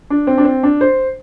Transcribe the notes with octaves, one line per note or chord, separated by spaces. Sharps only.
D4
C4
D4
C4
D4
C5